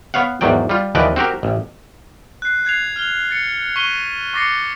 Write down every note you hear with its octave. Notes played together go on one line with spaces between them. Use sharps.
B3 C#5 F5 F#5
E2 G#2 D#3 F#3 D5 G5
G3 F4
D#2 E3 F3 B4 D5 D#5
C4 F#4 G4 A#4
A1
F#6 C7
F#6 G#6 C7 F7
F6 F7 G7
A6 C#7
C#6 B6 D#7 G7
C#6 D6 A6 A#6 C7 C#7